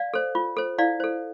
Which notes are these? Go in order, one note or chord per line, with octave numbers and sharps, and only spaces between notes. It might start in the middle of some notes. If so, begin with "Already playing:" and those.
Already playing: D5 F5
A4 C5
F4
A4 C5
E4 D5 F5
A4 C5